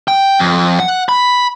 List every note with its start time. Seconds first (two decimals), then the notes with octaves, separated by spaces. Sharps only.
0.08 G5
0.39 F2
0.80 F#5
1.09 B5